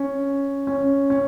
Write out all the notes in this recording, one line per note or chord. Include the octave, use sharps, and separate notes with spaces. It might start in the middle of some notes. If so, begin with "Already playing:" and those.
Already playing: C#4
C#4
C#4